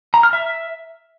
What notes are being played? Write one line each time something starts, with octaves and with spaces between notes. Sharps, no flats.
A#5
F6
E5